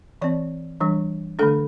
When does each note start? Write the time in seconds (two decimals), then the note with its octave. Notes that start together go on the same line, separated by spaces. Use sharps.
0.22 E3 C4 D5
0.80 E3 G3 D4
1.39 D3 A3 D4 A4